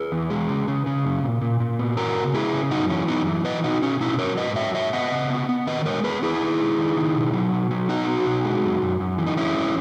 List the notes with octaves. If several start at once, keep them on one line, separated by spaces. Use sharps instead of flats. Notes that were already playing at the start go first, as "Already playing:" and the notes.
Already playing: G#4 B4
E2
G#3
C#3
C#3
C#3
F#2
A#2
A#2
A#2
B3
E3 F#4 A#4
C#3
G#3 E4 G#4
C#3
F#2 D#4 F#4
E3 C#4
F#2 B3 D#4
E3
F#3 B4 D#5
B2 D#4 F#4
B2 C#4
B2 C#4 E4
F#3 A#4 C#5
G#2 B4 D#5
F#3 C#5 E5
G#2 C#5 E5
B3 D#5 F#5
C#3
B3
B3
D#3 B4 D#5
G#3 A#4 C#5
B3 G#4 B4
E2 E4 G#4
D#3
G#3
D#3
D#3
B2
F#3
B2
F#3
B3 D#4 F#4
B3
B2
G#3
F#2
F#2
F#2
E3
D#4
G#3 C#4 E4
E2